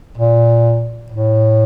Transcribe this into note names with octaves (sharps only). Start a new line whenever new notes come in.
A#2
A2